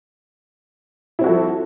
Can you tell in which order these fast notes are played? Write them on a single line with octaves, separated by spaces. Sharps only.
E4 C4 F#4 A4 F3